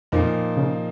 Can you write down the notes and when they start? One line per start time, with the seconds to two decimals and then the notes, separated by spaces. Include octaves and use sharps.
0.12 F2 A#2 F3 A#3 D#4
0.57 C#3